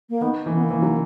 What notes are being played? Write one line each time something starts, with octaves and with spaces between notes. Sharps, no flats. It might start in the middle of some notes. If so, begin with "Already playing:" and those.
A#3
D#3 B3
E3 A#3
B3
A#3
E3
F#3